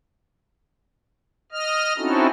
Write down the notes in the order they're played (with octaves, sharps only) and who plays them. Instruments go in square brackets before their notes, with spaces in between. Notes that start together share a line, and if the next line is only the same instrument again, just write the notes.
[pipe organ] D#5 F6
C4 C#4 D#4 E4 F#4 A4